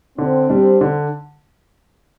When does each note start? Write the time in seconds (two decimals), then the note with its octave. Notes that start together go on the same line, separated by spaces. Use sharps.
0.18 D3 C4
0.50 G3 D4
0.81 D3